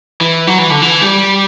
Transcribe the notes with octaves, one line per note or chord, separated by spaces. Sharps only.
E3
F#3
E3
D3
E3
G3